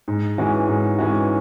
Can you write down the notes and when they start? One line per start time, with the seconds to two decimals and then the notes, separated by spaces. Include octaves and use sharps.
0.08 G#2
0.38 E3 G#3 C#4 F#4
0.68 G#2
0.99 E3 G#3 C#4 F#4